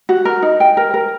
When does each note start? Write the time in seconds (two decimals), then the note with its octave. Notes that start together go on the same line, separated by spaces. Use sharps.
0.09 F#4
0.25 A#4
0.42 D#4
0.60 G5
0.77 A#4
0.94 A#4